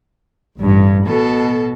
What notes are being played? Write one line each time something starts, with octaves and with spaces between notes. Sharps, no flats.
A1 G2
B2 A4